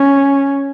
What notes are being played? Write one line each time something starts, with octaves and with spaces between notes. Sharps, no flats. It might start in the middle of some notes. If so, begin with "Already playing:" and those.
Already playing: C#4